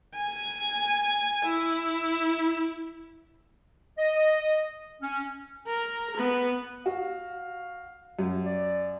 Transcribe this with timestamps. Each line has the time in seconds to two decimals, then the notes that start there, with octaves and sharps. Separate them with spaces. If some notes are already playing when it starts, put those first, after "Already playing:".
0.16 G#5
1.45 E4
3.99 D#5
5.02 C#4
5.67 A#4
6.17 B3
6.86 F#4 F5
8.19 F#2
8.45 D5